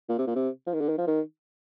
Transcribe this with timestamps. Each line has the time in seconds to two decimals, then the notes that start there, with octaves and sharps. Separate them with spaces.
0.09 A#2
0.18 C3
0.27 A#2
0.36 C3
0.67 F3
0.74 D#3
0.81 D3
0.89 D#3
0.98 F3
1.07 D#3